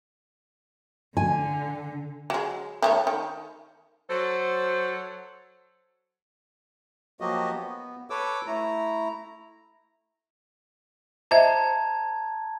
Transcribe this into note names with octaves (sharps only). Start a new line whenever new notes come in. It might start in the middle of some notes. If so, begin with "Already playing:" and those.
D3 G#5
F#3 G#3
D#3 A3 C#5
D#3
F#3 A4 C5
F3 F#3 A#3 F#4 G4 D#5
B3
A4 B4 C#5 D6 E6
A3 E4 A#5
C5 D#5 E5 A5 A#5 G#6